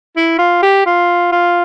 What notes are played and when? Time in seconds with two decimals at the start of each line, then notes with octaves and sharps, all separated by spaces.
0.16 E4
0.38 F4
0.62 G4
0.86 F4
1.32 F4